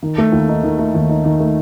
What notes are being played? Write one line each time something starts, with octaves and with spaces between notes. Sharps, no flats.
D#3
A3
D#2
D#4
D#3
A3
D#2
D#4
D#3
A3